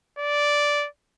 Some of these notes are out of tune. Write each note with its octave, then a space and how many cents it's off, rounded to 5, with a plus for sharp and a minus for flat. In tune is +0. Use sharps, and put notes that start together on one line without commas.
D5 -5